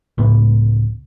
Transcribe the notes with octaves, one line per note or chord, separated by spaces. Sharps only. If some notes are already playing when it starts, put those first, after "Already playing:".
C#2 A2 B3